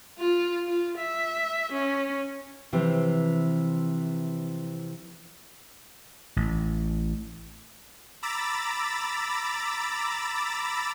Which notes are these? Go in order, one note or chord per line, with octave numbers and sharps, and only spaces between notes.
F4
F4
E5
C#4
C3 E3 F3 C4
A1
A#5 B5 D6 E6 A6